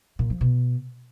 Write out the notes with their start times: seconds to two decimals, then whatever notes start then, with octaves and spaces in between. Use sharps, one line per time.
0.19 A#2
0.30 F3
0.41 B2